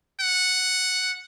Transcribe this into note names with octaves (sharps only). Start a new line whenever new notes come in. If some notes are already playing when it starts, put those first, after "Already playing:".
F#5